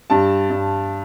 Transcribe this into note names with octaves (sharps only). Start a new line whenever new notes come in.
G2 A5
G2